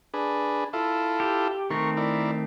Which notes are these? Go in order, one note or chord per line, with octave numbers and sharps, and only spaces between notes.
D4 G#4 B4
E4 F4 A4
G4
D#3 A3 C4 A#4 C#6
E4 A#4 D5